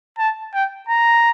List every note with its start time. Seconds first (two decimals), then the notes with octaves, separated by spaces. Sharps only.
0.19 A5
0.54 G5
0.89 A#5